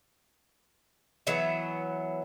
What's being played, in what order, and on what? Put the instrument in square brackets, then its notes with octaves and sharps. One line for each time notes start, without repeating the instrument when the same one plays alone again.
[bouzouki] E3 F#3 B3 E5